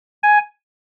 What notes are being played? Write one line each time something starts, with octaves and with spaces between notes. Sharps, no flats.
G#5